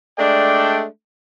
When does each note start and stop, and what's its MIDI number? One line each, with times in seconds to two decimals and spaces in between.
0.18 0.84 56
0.18 0.84 57
0.18 0.84 62
0.18 0.84 74
0.18 0.84 79